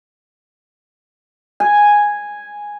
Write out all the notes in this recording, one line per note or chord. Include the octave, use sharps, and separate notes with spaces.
G#5